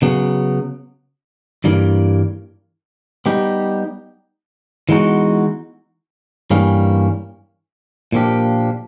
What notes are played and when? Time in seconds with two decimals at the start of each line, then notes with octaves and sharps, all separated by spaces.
0.02 C#3 F#3 B3
1.64 G2 E3 G3 A#3
3.26 G3 B3 D#4 G4
4.89 E3 G#3 B3 D#4 F#4
6.51 G2 E3 G3 A#3 C#4
8.12 A#2 F3 A#3 D4 G4